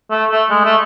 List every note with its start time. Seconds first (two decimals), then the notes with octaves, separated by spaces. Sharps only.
0.11 A3
0.31 A3
0.50 G#3
0.65 A3